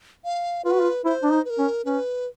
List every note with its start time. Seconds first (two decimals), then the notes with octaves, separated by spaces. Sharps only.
0.24 F5
0.65 F4 B4
0.73 F#4
0.81 F4
1.05 E4 C5
1.23 D4
1.31 D#4
1.45 B4
1.50 A#4
1.58 C#4
1.85 C#4 B4